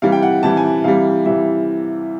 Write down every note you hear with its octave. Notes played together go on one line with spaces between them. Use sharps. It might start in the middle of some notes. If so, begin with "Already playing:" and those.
C3 E3 G3 F5
G5
F#5
C3 E3 G3 A5
G#5
C3 E3 G3 F5
C3 E3 G3 E5